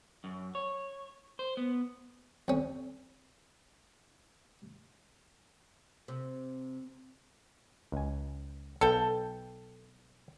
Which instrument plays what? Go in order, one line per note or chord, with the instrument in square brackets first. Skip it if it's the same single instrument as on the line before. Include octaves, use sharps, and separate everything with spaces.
[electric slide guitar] F#2
C#5
C5
B3
[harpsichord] F2 C#4
[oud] C3
[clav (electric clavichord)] C#2 G#5
[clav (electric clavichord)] B1 B4 F5 [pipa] A4 G5